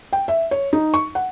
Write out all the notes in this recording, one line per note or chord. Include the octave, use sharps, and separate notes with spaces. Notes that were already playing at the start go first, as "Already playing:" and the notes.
G5
E5
C#5
D#4
C#6
F#5